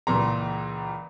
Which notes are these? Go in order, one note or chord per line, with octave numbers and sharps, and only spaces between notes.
C#2 A#2 E3 A#5 C6